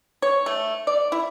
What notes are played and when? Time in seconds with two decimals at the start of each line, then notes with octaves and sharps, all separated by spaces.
0.22 C#5
0.46 A3
0.87 D5
1.12 E4